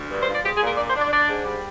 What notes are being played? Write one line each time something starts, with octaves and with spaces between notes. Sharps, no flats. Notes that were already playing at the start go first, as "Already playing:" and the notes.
Already playing: D2
G2
C5
F3 D5
G#3 G4
G#4
A#2
A#4
D4 D5
C5
D4
D5
D4 D5
G#2
G3